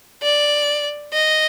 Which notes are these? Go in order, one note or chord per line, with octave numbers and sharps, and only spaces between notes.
D5
D#5